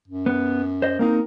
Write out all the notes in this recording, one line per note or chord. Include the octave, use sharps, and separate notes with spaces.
F#2
B3
C5 D#5
A#3 C4 D#4 A#4